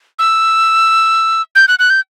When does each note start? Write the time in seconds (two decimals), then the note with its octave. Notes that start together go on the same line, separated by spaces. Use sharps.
0.19 E6
1.55 G6
1.68 F#6
1.79 F#6
1.90 G6